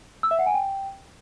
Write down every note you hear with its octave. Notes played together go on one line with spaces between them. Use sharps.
E6
E5
F#5
G#5
G5